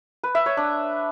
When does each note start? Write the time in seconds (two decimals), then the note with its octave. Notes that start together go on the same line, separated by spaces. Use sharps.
0.24 B4
0.35 E5
0.46 C#5
0.57 D4